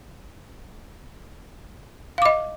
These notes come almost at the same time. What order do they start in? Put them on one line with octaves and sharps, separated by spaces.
F5 D6 D#5